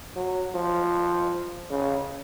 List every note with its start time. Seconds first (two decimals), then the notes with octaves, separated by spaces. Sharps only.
0.16 F#3
0.55 F3
1.70 C#3